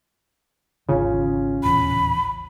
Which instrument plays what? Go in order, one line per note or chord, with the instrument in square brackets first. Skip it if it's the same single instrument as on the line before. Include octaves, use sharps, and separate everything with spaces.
[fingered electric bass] G#1 E2 [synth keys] C#3 [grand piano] C#4 F4
[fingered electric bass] D#1 A1 E2 [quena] B5